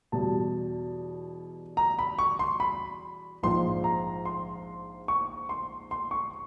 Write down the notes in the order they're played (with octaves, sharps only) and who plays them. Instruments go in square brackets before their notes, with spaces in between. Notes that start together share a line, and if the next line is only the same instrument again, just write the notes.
[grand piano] E2 B2 G3 A5
A#5
B5
C#6
C6
B5
A#1 G#2 F3 G#3 C6
A#5
C6
C#6
C6
C6
C#6